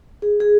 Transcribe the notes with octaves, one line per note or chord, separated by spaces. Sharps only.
G#4
G#4